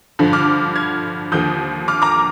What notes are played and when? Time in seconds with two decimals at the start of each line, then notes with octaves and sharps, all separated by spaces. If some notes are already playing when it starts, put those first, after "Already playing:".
0.19 G2 D3 F3
0.33 D6 F6
0.76 F6 G#6
1.32 D#2 D3 F3 D#6 G6
1.88 D6 F6
2.02 A#5 D6